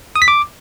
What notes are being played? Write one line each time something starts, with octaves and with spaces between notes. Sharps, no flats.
D#6
B6
D6